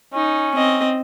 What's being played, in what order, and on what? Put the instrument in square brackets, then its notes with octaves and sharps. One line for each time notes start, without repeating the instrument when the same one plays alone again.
[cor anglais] C#4 [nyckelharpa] D#4
[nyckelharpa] C4 D#5